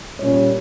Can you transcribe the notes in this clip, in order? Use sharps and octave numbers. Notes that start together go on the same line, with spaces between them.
A#2 G3 C#4 C#5